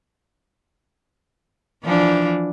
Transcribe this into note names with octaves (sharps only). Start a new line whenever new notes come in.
E3 F3 D4